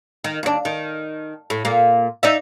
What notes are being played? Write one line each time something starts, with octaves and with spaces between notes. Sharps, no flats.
D#3
D#2 D4
D#3
A2
A#2 A#3
D#4 D5 E5